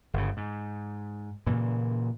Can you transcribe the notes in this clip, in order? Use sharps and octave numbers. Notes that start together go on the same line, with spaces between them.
G1 C#3
G#2
A#2 C#3 E3